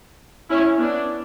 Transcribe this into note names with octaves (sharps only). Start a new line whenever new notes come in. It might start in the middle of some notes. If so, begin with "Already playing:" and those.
C#4 E4
B3 D4